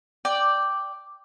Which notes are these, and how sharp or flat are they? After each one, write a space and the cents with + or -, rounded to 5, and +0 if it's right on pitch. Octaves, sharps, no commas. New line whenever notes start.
D5 +0 G5 +0